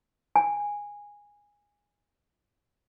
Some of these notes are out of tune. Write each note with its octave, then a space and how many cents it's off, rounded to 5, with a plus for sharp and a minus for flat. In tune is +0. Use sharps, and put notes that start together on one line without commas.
G#5 -15